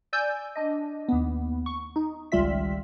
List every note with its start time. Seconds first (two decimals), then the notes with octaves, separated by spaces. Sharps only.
0.13 D5 G#5 E6 G6
0.56 D4 D#5
1.08 D#2 B3
1.66 C#6
1.96 D#4
2.32 G#1 C#2 G3 F4 E5 B6